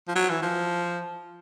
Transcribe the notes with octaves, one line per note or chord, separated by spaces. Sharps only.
F3
F#3
E3
F3